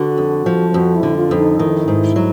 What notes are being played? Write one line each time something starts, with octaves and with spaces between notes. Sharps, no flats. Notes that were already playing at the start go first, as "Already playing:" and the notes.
Already playing: D3 F#4
F2
F3
F2 F#4
E4
D3
F4
F2
D#4
D#3 E4
G#2
F#3